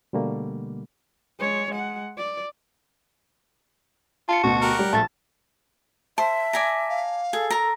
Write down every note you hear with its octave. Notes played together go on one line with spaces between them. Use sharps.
B2 D3 G3 A3 A#3
G#3 C#5
G#3 F#5
D5
F4 A5 C#7
D2 B2 F#4
G4 A#4 F#5
G3
A#1 A3 A5 A6
C5 E5 A5
D5 G#5 A#5
F5
G#4 A4
A#4 A#5